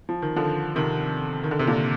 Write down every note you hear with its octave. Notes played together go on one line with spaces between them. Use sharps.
F3
D#3
D3 F3
C3 D#3
D#3
D3
C3
A#2 D3